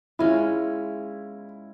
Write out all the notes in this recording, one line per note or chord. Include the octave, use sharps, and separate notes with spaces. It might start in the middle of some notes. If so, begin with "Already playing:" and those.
G#3 C#4 E4 F4